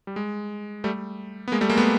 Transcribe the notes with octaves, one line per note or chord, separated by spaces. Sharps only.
G3
G#3
G3 A3
B3
G#3 A#3
G3 A3
G#3 A#3
A3 B3